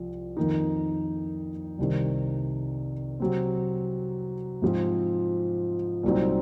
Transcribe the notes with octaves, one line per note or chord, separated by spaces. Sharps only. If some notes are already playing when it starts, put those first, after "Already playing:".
Already playing: C2 F3
F2 D#3 A#3 D#4
C2 C3 D#3
C3 F#3 C4
G#2 F3 C4
C2 A#2 F#3 C4 D#4